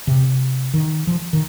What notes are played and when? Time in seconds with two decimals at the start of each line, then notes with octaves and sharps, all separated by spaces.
0.07 C3
0.74 D#3
1.07 F3
1.33 D#3